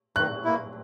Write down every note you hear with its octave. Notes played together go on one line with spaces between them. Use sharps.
D#3 F#6
A#3 E4